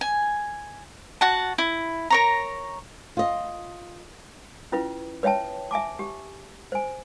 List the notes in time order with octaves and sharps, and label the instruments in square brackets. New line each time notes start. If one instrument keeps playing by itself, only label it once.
[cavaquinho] G#5
F#4 F#5 A5
E4
A#4 C#5 A#5
[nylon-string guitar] F4 D#5
[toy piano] C#4 E4 F4 B4
B4 C#5 E5 G5 A5
E5 G#5 A5 D6
G4
C5 G#5